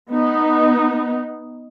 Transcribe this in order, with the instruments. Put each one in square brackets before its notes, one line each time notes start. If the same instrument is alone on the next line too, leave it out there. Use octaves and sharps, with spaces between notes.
[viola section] B3 D#4